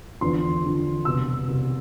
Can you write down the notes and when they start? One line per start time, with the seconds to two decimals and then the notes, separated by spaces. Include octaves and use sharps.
0.21 E2 D3 F3 C6
0.63 E2 D3 F3
1.05 C2 B2 E6
1.48 C2 B2